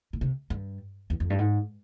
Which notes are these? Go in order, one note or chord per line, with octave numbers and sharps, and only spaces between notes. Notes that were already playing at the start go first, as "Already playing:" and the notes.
A#2
C3
G2
E2
F2
G2
G#2